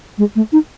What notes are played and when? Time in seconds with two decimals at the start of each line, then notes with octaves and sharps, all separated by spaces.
0.18 G#3
0.36 A3
0.52 D#4